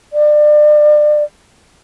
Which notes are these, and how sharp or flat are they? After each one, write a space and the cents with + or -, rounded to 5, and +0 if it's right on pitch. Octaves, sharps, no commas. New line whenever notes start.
D5 +30